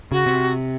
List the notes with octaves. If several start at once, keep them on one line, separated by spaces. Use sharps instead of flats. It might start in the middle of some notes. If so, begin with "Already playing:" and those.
C#3 F#4
C3